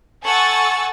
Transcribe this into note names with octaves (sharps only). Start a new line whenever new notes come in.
A4 F#5 G#5 C#6 E6 A6